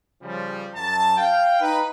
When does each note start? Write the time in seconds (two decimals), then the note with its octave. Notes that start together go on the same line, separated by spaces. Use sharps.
0.22 C#3 F3 G3
0.75 F#2 A5
1.17 F5 G5
1.60 D#4 B4